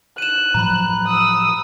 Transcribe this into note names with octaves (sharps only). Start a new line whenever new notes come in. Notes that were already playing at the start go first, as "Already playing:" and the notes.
F#6 D#7 E7
A2 F3 F#3 A#5 B5
D#6 E6